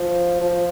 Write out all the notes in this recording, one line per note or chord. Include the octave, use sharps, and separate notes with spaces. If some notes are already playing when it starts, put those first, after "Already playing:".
Already playing: F3
F3